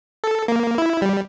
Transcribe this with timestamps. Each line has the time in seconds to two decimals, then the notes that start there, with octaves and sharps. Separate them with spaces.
0.24 A4
0.48 A#3
0.78 E4
1.02 G3